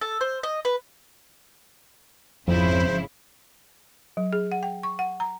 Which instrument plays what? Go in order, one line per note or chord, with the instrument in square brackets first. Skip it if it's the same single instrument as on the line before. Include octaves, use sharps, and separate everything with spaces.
[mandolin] A4
C5
D#5
B4
[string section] G#1 C#3 E4 [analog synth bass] F2 [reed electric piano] F3 [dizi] C5
[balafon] F#3
G#4
F#5
G5
C#6
F#5
A#5